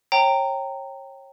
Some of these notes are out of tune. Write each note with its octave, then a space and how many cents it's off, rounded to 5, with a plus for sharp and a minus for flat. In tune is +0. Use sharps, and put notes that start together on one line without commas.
C#5 -30 G5 -5 A#5 -20